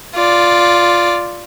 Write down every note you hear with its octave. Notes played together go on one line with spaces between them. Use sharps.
F4 D5